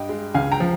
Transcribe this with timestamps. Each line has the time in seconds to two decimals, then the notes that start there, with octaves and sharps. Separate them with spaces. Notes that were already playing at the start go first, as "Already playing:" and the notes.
Already playing: G2 D#5 G5
0.09 G#3
0.34 C#2 F5 G#5
0.52 G5 A#5
0.60 F3